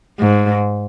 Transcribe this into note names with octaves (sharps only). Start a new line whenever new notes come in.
G#2